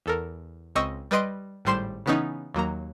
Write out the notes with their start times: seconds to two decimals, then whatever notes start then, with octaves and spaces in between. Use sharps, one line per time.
0.06 E2 A4 A#4
0.75 C#2 C4 D#5 C#6 E6
1.11 G3 B4 D#5 C6 D7
1.65 G#1 A2 G3 C5 C6 E7
2.06 C#3 E3 B3 C#4 D#4
2.54 D#2 F#3 A#3 A#5